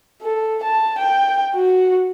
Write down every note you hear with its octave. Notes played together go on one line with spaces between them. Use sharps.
A4
A5
G5
F#4